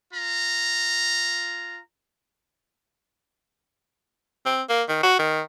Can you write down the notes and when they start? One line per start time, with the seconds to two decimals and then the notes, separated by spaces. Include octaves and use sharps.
0.14 F4 A#5
4.46 C4
4.69 A#3
4.89 D#3
5.03 F#4
5.19 D#3